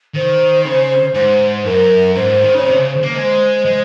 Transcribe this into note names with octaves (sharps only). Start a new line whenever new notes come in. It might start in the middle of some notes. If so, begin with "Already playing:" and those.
D#3 C5
C#3
G#2 C5
F#2 A#4
G#2 C5
D#3
C#3 C#5
C3 C5
C#3
A#3
G#3 C5
G#3